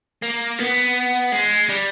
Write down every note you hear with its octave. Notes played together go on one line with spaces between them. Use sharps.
A#3
B3
G#3
G3